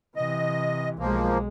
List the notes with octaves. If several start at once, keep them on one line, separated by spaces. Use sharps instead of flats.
C3 E3 D#5
B1 F3 G#3 A#3